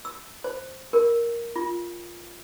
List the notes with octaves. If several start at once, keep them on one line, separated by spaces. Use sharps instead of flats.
E6
C5
A#4
F4